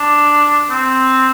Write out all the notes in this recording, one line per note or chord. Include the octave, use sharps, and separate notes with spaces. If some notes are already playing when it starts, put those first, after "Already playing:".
Already playing: D4
C4